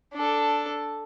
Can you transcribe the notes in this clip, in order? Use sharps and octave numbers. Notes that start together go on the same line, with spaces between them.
D4 A4